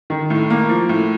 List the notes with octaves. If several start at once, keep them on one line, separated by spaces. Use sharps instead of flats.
D#3
A2
A#3
F3
A2